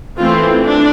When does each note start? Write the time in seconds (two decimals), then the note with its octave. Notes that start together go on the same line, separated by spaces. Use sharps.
0.18 E3 A3 C4 F4
0.63 D4